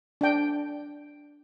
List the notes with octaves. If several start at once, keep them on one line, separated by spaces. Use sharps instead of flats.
D4 G5